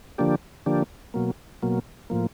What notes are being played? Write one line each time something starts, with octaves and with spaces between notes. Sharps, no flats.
D3 F3 A#3 D4 G4
D3 F3 A#3 D4 G4
B2 F#3 A#3
B2 F#3 A#3
A2 F3 A#3